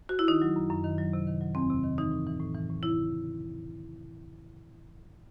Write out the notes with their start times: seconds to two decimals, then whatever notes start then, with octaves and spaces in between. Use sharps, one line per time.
0.09 F#4
0.19 E4
0.28 D#3 D#4
0.42 F#3
0.56 F#2
0.70 F#2
0.84 D#3
0.98 F#3
1.13 C3
1.27 D#3
1.41 F#3
1.55 E2 C4
1.70 C3
1.83 D#3
1.98 E3 D#4
2.12 A2
2.27 E3
2.40 A2
2.55 E3
2.69 A2
2.82 C#3 E4